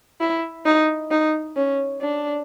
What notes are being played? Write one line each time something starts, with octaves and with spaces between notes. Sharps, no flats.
E4
D#4
D#4
C#4
D4